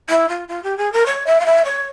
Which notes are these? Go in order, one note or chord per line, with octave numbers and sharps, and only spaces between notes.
E4
F4
F4
G4
G#4
A#4
C#5
E5
F5
E5
C#5